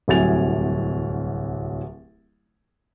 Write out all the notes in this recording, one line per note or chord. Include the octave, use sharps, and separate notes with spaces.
D1 C2 F#3 G#5 A6 F7